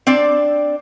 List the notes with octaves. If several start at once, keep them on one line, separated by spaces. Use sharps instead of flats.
C4 D4 D5